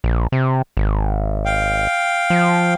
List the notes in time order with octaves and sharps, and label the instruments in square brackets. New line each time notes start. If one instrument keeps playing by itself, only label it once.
[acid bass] A#1
C3
G#1
[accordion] F5 G5
[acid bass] F3